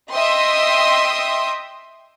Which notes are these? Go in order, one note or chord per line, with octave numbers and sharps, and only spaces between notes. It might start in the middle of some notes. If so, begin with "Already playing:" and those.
D#5 E5 G5 C6 D#6